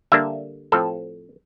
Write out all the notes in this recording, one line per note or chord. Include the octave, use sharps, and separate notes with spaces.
D3 G3 A#3 D4 E5
A2 F3 C4 A4